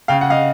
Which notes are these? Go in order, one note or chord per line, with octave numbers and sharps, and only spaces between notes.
C#3 F5 G5
F#5
D#5 F5